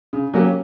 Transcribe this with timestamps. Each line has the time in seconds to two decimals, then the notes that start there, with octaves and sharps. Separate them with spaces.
0.13 C#3
0.34 F#3 A#3 C#4 G4